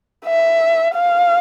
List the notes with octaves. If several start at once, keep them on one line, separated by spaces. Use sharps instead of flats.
E5
F5